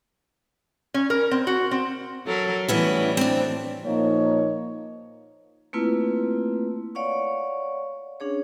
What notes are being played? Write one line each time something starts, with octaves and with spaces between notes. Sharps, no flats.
C#4
A#4
C4
F#4
C4
F#3 A4 A#4
A2 E3 G3 B3 C#4 E4
C4 D4
A#2 F3 A#3 D#4 C#5
A3 A#3 C4 E4 F4 B4
C#5 D5 F5 F#5 C#6
C#4 D4 G#4 C#5